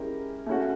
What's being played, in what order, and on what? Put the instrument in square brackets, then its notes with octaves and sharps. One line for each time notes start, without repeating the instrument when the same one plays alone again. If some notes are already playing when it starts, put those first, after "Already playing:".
Already playing: [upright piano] G#3 C#4 E4 G4 A#4
A3 C#4 F#4